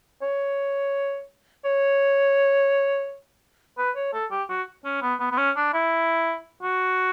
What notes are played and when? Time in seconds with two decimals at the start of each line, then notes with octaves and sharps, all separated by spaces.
0.22 C#5
1.65 C#5
3.78 B4
3.96 C#5
4.13 A4
4.31 G4
4.50 F#4
4.85 C#4
5.02 B3
5.20 B3
5.31 B3
5.38 C#4
5.57 D4
5.74 E4
6.63 F#4